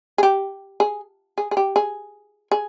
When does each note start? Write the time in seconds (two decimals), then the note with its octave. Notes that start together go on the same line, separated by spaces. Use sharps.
0.18 G#4
0.23 G4
0.80 G#4
1.38 G#4
1.51 G#4
1.57 G4
1.76 G#4
2.52 G#4